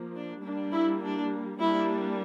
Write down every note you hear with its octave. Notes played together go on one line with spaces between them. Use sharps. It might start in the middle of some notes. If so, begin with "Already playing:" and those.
Already playing: F3 A#3
D4
G3 A#3 D4
E4
D4
G3 A#3 D4 E4